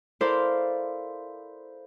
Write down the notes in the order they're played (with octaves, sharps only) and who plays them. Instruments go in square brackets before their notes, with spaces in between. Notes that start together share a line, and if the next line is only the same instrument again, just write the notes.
[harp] E4 A4 A#4 C5 D5 F5